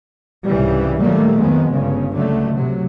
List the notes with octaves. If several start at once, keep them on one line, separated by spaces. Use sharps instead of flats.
C2 G#2 C#3 E3 G3
A#2 D#3 F#3 G3 A3 A#3
F2 D#3 F#3 G#3 B3
G1 G2 C#3
C#2 D3 F#3 A3
C3 F#3